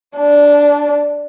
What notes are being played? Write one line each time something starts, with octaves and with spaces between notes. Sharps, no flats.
D4